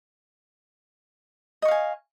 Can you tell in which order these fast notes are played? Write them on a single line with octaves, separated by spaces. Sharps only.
D#5 C#6 F5 G#5